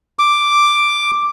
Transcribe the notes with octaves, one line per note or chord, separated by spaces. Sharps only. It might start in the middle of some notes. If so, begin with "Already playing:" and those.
D6